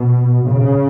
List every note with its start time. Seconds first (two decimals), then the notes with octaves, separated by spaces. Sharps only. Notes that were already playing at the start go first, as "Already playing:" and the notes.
Already playing: B2
0.49 C#3